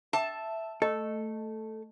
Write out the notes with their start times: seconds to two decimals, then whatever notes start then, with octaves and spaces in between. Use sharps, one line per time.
0.13 E5 G5 A5
0.82 A3 A4 D#5